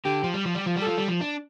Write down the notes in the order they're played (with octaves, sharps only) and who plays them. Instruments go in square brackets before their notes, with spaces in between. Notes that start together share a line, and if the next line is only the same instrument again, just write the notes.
[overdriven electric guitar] D3 [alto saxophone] G4
[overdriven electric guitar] F3
G3
F3
G3
F3
G3
[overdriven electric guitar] F3 [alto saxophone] A4
[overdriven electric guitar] G3
F3
D4